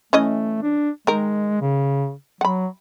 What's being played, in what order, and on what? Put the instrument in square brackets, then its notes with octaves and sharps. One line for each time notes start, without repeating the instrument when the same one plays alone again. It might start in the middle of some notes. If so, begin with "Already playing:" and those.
[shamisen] E3 C#4 D#5 [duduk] A3
[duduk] D4
[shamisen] D#3 A#4 [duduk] G#3
[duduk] C#3
[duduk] F#3 [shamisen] F#5 B5